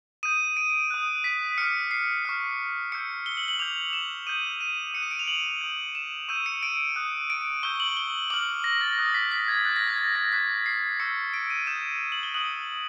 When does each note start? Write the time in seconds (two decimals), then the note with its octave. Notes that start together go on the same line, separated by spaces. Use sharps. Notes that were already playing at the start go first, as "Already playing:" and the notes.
0.23 D#6 G6 D#7
0.57 D7
0.90 D#6 F#6
1.24 B6
1.58 D6 F6 C#7
1.91 C7
2.25 C#6 F6
2.92 C#6 E6 G6 C#7
3.26 G7
3.37 F#7
3.48 F#7
3.59 D6 G6 F7
3.93 E7
4.27 D#6 G6 D#7
4.61 D#7
4.94 D#6 F#6 C#7
5.03 D#7
5.11 D7
5.19 F7
5.28 F#7
5.61 D#6 G6
5.95 E7
6.28 C#6 E6 G6 D#7
6.46 C#7
6.63 D7
6.96 D#6 F#6
7.30 D7
7.63 C#6 E6 G6 G7
7.80 F#7
7.97 G7
8.30 D6 F6 F#7
8.64 A#6
8.81 A6
8.98 D#6 F#6
9.14 B6
9.31 B6
9.48 G#6
9.65 C#6 F#6 A6
9.76 A#6
9.88 G#6
9.98 A6
10.16 A#6
10.32 C#6 F#6 B6
10.66 C7
11.00 C#6 E6 G6 C#7
11.34 D7
11.50 D#7
11.67 D#6 G6 E7
12.12 F#7
12.23 G7
12.34 D#6 F#6 F#7